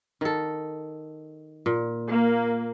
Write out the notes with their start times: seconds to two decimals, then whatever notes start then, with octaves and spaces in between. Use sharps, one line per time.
0.21 D#3 A4
1.66 A#2
2.09 A#3